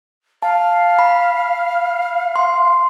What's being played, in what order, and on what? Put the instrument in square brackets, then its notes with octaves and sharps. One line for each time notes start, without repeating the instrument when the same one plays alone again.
[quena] F5 [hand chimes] A5
[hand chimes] B5
C6